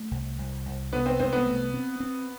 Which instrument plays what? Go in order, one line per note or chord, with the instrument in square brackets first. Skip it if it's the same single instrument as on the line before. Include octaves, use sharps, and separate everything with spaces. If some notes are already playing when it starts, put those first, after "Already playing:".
Already playing: [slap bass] A3
C2
C2
C2
[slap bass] C3 [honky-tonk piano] B3
[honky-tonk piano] C4
[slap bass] C2 [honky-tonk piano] C4
[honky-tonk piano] B3
[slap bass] A3
C4
C4